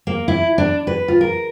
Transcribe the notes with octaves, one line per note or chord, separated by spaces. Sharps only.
A#3
E4
D4
B4
F4
A#4